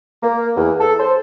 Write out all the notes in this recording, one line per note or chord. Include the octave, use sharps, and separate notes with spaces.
A#3
E2
A4
C5